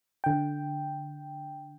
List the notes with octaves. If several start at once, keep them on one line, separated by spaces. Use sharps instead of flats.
D3 G5